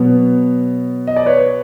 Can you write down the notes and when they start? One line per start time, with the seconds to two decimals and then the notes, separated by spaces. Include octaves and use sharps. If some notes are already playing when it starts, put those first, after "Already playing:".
Already playing: B2 F#3 B3
1.07 D#5
1.16 D5
1.26 B4 C#5